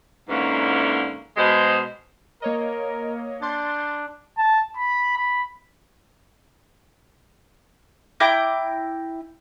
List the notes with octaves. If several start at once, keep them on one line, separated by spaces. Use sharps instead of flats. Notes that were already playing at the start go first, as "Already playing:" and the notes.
E2 G#2 D3 E3 A#3 C#4
B2 G#3 C5
A#3 A#4 C#5 D#5
D4 C6 G6 A6
A5
B5
B5
E4 G5 A#5 D6